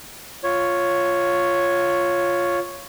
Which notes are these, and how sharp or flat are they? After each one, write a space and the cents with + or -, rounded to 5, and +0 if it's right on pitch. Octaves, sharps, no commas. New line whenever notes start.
F4 +0 C#5 +0